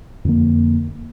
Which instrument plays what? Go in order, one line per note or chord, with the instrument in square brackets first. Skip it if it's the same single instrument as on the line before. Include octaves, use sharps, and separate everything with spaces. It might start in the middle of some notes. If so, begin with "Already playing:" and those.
[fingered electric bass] F2 D3 A#3